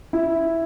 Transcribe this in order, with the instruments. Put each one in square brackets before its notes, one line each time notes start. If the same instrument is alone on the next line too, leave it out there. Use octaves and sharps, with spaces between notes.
[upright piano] E4